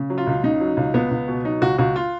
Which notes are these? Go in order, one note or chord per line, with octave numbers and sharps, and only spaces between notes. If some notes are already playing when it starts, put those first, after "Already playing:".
Already playing: C#3
F#3
F4
C#2
C#3 D#4
F#3
C#2
C#2 B3
C#2
B2
F#3 D#4
C#2 F#4
C#2 F#4
F4